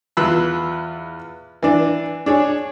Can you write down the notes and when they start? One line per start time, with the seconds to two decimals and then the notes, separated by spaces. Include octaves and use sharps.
0.17 E2 F4 B4 B5 E6 F#6
1.63 E3 D4
2.26 D4 G#4 C#5